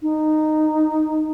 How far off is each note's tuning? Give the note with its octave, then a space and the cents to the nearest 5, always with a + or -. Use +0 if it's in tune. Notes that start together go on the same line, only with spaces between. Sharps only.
D#4 -10